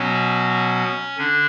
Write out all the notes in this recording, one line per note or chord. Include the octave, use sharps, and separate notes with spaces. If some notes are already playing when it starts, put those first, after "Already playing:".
Already playing: B2 F#3 B3 C#4
D3 D4